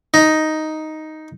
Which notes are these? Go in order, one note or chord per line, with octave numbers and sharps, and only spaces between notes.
D#4